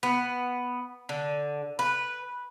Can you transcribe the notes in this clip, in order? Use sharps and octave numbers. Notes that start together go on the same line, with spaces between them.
B3
D3
B4